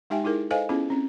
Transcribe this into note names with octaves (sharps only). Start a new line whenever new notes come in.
G#3 D#4 G4 E5 G5 G#5
D#4 E4 G#4 A#4
A4 B4 C5 D#5 F5 G#5
B3 C#4 E4 F4 G#4
C4 C#4